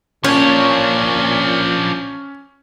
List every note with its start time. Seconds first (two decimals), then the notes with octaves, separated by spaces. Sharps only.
0.24 A#2 F3 C#4 D4 C#5